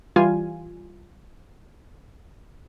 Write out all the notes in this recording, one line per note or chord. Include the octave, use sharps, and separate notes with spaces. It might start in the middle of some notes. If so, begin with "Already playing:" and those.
E3 G3 F4 G#5